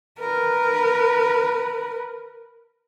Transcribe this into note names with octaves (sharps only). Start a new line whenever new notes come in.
A#4 B4